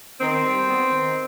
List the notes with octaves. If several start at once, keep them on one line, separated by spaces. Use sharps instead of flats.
D#3 C4
G3
B3
D#3